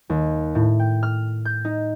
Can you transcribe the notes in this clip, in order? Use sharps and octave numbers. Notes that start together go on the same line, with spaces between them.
D#2
A2
G5
F6
G6
D#4